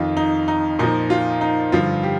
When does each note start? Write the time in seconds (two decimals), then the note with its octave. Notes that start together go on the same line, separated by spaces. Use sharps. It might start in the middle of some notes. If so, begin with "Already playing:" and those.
Already playing: F2 D#3 F4
0.17 D#4
0.48 D#4
0.79 A#2 F3 D#4
1.10 F4
1.41 D#4
1.72 G2 D3 F3 F4
2.03 G4